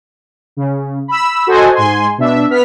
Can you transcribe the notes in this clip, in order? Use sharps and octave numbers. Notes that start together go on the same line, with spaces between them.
C#3
B5 E6
F#4 A4 C5 D#5 F#5 G#5
G#2 G#5 C6
B2 D4 E5
B3 F6 B6